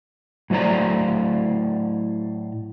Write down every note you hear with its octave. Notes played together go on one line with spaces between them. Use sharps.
A2 F#3 E4 C5 D5 A#5